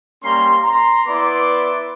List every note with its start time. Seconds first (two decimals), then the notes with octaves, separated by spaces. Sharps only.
0.24 G3 A#3 C#4 A#5 C6
0.62 A#5 C6
1.07 B3 E4 B4 D5 C6 D6